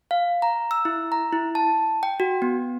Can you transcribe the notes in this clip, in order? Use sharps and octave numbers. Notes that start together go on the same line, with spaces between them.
F5
A#5
E6
E4
A#5
E4
A5
G5
F#4
B3